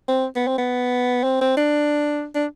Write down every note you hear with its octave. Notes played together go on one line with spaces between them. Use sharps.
C4
B3
C4
B3
C4
C4
D4
D4